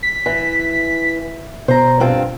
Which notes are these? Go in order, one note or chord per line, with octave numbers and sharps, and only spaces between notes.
B6
E3
B2 C5 A#5
G2 C4 F4